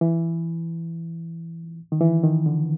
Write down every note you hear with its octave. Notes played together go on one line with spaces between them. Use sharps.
E3
D#3
E3
D#3
D3